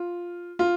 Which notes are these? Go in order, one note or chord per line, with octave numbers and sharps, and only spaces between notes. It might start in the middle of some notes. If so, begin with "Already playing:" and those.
Already playing: F4
F4